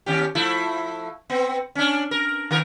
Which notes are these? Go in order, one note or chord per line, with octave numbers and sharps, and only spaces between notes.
D#2 C#4 G4
F3 A3 E4
B3 C4
C#4 D4
A#4
D#3 A#4